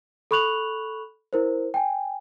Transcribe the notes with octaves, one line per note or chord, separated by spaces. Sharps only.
A4 B5 C#6 F#6 F7 F#7
E4 A#4 C5
G5 G#5